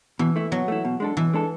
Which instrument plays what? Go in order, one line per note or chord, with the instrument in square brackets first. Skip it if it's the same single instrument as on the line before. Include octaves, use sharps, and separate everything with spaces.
[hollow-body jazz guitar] B2 [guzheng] E3
[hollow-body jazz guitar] A3 E4
[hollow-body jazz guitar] B2 [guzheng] F#3
[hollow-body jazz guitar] A3 E4
B2
G#3 D4 A4
[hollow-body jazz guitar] B2 [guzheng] E3
[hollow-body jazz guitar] G#3 D4 A4